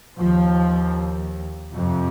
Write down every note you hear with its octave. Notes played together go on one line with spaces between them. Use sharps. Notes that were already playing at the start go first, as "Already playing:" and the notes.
D#2 F3
F2 C3